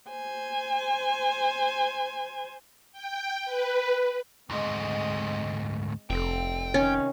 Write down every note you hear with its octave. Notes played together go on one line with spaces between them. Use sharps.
C5 G#5
G5
B4
D2 G#2 G#3 C4 D#5
F1 C4 A4 G5
C3 D#3 C#4